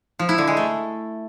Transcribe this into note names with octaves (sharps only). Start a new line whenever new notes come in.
F3
E4
D3
G#3
A3